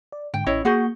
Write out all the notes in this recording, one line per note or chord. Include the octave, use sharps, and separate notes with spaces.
D5
G#2 D3 G5
A1 C#4 E4 C#5 D#5
A#3 F#4 G#4 F#5 C#6 G6